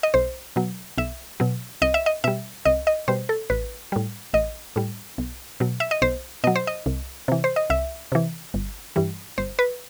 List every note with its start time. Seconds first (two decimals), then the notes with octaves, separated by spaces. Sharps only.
0.03 D#5
0.14 B1 C5
0.56 B2 F#3
0.98 B1 E5
1.40 B2 F#3
1.82 C2 D#5
1.94 E5
2.06 D#5
2.24 B2 G3 E5
2.65 C2 D#5
2.87 D#5
3.08 B2 G3 C5
3.29 A4
3.50 A1 B4
3.92 A2 G3
4.34 A1 D#5
4.76 A2 G3
5.18 B1
5.60 B2 F#3
5.80 E5
5.91 D#5
6.02 B1 C5
6.44 B2 F#3 D#5
6.56 C5
6.67 D#5
6.86 C2
7.28 C3 E3
7.44 C5
7.56 D#5
7.70 C2 E5
8.12 C3 E3
8.54 G1
8.96 G2 E3 G3
9.38 G1 C5
9.59 B4